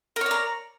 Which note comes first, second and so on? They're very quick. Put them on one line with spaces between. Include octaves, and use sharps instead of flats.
A#4 C#5 D5 A#5